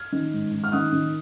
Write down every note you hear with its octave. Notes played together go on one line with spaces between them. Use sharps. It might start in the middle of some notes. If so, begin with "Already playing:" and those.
Already playing: F6 G#6
D#3
G#2
D#3
F6
D#3 D#6 F#6
D#3